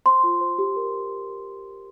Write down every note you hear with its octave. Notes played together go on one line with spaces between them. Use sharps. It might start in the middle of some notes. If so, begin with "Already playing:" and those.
C5 C6
F4
C5
G4
A#4